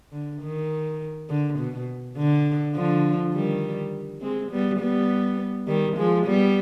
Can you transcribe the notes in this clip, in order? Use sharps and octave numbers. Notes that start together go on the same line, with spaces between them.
D3
D#3
D3
B2
D3
D3 F3
D#3 G3
G#3 C4
G3 B3
G3 B3
D#3 G3
F3 G#3
G3 B3